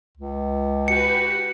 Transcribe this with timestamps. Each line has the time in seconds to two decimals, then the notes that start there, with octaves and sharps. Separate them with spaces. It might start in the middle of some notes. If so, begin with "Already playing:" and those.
0.18 C#2
0.88 F#4 G4 B4 C#7